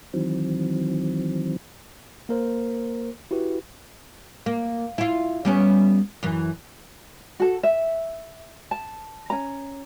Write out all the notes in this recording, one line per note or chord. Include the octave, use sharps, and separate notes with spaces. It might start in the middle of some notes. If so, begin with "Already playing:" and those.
D#3 E3 F#3 C4
A#3 A#4 C5
E4 F#4 G4 B4
A#3
E4 F4
G3 B3 C#4
F#2 E3
F#4 A4
E5
A5
C#4 A#5